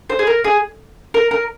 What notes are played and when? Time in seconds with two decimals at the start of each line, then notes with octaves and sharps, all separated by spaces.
0.10 C5
0.19 G#4
0.27 A#4
0.44 G#4
1.14 A#4
1.31 A#4